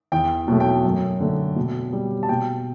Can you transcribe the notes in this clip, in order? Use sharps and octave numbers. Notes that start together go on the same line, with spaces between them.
E2 G5
B2 F#3 A3
G5
F#2
D3 A3
B2
G3
A5
B2 G5